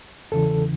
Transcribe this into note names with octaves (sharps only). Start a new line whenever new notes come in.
E2 C#3 E3 A4